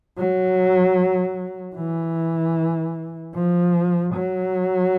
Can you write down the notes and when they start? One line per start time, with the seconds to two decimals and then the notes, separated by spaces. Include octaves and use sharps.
0.18 F#3
1.75 E3
3.35 F3
4.14 F#3